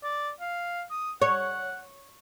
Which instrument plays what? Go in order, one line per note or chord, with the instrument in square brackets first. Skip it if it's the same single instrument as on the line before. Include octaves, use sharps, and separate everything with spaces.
[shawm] D5
F5
D#6
[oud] C#5 [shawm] F#5